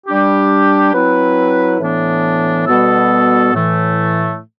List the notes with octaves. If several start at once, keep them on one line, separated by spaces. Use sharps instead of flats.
G3 D4 G4
F#3 C4 E4 B4
A2 E3 B3 D4
B2 G3 B3 F#4 A4
A2 E3 A3